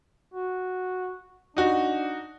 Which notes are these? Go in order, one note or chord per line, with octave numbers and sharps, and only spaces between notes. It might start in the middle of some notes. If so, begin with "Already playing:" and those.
F#4
D4 D#4 F#4